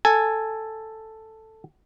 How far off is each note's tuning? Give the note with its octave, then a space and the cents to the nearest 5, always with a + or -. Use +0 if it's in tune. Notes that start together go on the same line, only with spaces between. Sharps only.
A4 +5 G#5 +0